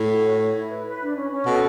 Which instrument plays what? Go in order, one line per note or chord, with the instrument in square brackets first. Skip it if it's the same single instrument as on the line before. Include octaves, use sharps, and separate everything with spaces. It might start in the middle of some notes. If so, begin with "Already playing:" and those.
Already playing: [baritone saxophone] A2
[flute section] F#4
C#5
C#5
E4
B4
B4
D4
C#4
C#4
[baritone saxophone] B2 [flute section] A4